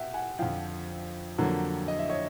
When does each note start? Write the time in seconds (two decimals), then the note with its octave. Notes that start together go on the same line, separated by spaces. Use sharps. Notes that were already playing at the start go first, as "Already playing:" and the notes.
Already playing: B2 E5 F#5 G5
0.14 F#5 G#5
0.39 F2 D3 F3 F5 G5
1.38 F2 D3 F#3 A#3
1.88 D#5
1.99 E5
2.09 C#5 D#5